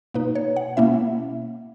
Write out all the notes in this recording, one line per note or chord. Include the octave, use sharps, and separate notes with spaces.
B2 A#3 D#4 B4
C#5
F#5
B2 A#3 C#4 E4 E5